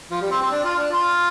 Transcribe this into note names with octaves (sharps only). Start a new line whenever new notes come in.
F3
G3
C4
C4
D4
F4
D4
F4